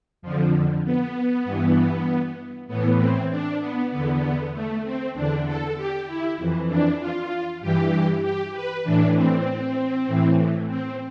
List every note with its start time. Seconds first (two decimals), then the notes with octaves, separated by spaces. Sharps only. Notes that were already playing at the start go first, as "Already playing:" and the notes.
0.22 F2 D3 F3
0.84 B3
1.45 G2 E3
2.68 A2 E3 B3
2.99 C4
3.30 D4
3.60 B3
3.91 E2 D3 B3
4.53 A3
4.84 C4
5.14 E2 D3 D4
5.45 A4
5.77 G4
6.07 E4
6.37 F2 E3
6.68 D4
7.00 F4
7.61 G2 E3 G4
8.22 G4
8.53 B4
8.84 A2 E3 D4
9.15 C4
10.07 A2 E3
10.69 C4